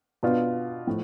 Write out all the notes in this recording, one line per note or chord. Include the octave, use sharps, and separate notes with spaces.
B2 B3 D4 F4
A2 F3